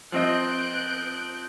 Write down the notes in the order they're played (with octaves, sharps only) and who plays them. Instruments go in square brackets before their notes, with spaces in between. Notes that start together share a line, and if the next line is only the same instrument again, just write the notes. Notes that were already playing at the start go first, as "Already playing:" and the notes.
[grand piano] F3 C4 D#5 [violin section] F#6 G6 D7